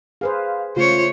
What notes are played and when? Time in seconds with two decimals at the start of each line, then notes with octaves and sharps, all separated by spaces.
0.21 G#4 B4 C5 F5
0.76 C#3 A3 F4 C5 C#5